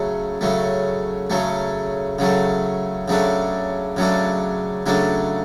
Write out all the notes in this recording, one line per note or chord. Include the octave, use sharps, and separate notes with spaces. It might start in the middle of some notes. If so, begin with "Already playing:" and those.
Already playing: C#3 F#3 A3
C#3 F#3 A3
C#3 F#3 A3
C#3 F#3 A3
C#3 F#3 A3 D4
C#3 F#3 A3 D4
C#3 F#3 A3 D4